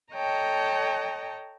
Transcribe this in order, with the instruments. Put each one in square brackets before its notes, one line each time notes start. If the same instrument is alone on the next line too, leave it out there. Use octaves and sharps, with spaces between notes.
[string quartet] A4 C#5 D#5 G5 A5 A#5